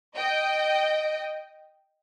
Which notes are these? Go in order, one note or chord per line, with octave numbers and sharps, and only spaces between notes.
D#5 G5